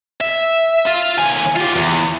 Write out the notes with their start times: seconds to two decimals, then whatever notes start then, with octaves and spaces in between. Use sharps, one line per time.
0.20 E5
0.87 F4
1.18 D#2 G#5
1.56 F4 G4
1.76 E2